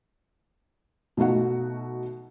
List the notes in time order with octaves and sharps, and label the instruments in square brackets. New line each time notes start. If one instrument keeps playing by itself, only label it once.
[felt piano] B2 A3 D#4 F#4 F#5